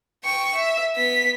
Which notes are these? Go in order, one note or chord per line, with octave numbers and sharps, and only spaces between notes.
G5 C#6
E5
B3 B6